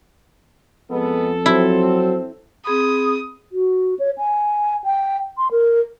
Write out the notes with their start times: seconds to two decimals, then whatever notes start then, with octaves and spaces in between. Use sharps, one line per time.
0.91 F2 G#3 B3 A4
1.46 F#3 C4 E4
2.65 C4 G#4 B5 D#6
3.52 F#4
3.99 C#5
4.18 G#5
4.84 G5
5.38 C6
5.51 A#4